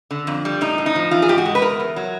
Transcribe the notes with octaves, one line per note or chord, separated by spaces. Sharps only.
D3
F2
G3
A2 D#4
A2
D#4
F3
E3 F4
G#4
G#2 G4
F#4
G#3
B4
E2 A#4
E2
F#3